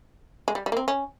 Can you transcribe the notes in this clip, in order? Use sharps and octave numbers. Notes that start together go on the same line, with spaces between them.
G#3
G3
G3
A#3
C4
C#4